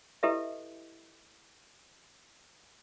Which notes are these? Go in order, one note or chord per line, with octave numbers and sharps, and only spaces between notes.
E4 G4 A4 B4 D#5 E5